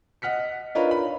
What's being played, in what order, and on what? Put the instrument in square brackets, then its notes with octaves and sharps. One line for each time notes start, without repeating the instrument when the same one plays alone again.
[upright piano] D#5 F#5 F6 B6 C#7
D4 D#4 F4 A#4 B4 C#5
B5